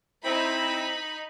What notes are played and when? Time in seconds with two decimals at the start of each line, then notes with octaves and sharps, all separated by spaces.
0.24 C4 D#4 E4 B5